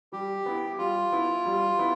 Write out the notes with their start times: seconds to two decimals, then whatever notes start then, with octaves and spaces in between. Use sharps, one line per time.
0.12 G3 G4
0.46 B3 E4
0.78 G3 F4
1.12 B3 E4
1.46 G3
1.79 B3 E4